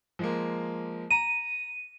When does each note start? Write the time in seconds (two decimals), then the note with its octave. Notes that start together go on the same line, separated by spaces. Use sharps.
0.19 F3 G#3 A#3
1.10 A#5 D#7